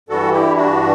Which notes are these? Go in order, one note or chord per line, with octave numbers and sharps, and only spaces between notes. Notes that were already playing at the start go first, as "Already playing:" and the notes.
G2 E3 G3 F#4 A4
E4 G4
D4 F#4